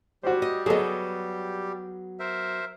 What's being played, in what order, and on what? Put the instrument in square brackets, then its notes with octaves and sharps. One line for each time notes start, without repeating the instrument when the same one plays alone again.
[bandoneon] G3 G4 [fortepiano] F#4 C5
[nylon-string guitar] D#5
[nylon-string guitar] F#3 B3 [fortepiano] G#4 A4 D#5
[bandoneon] A#4 C5 E5